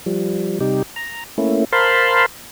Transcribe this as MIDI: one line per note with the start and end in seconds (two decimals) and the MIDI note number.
0.06 0.59 53
0.06 0.59 55
0.60 0.82 48
0.60 0.82 55
0.60 0.82 63
0.60 0.82 67
0.96 1.24 82
1.38 1.64 57
1.38 1.64 58
1.38 1.64 61
1.38 1.64 64
1.72 2.26 70
1.72 2.26 72
1.72 2.26 77
1.72 2.26 81
1.72 2.26 83
1.72 2.26 84